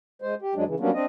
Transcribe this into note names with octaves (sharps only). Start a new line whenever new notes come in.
G#3 C5
G4
F#2 F#3 G#3 D4
C#3 E3
F#3 G3 A#3 B3 C#4 D4
C4 D4 D#5